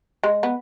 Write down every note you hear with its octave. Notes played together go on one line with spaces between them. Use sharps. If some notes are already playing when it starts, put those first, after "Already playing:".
G#3
B3